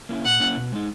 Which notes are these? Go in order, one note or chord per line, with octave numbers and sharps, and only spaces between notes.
A#3 C#4 E4
A#2 F#5
A#3 C#4 E4
B2
G#3 D#4